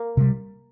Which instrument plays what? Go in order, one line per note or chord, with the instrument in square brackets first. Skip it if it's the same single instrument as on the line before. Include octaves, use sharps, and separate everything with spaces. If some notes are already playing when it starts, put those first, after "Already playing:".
Already playing: [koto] A#3
[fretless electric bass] C3 G3